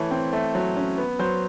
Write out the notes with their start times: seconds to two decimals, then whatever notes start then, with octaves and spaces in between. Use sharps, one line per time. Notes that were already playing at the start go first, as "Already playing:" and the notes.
Already playing: E3 A3 C#5
0.11 C4
0.33 A3
0.55 F#3
0.76 C#4
0.98 B3
1.19 F#3 C5